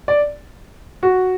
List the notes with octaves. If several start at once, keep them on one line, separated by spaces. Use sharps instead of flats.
D5
F#4